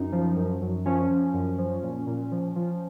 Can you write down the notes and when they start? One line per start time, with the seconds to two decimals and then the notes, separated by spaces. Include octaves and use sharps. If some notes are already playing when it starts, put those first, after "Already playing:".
Already playing: F#2 D#4
0.12 F3
0.36 F#2
0.62 F#2
0.85 F3 C#4
1.10 F3
1.34 F#2
1.58 F3
1.83 A#2
2.07 A#2
2.32 F3
2.56 F3